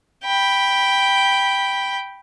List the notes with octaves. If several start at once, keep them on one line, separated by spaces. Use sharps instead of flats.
G5 B5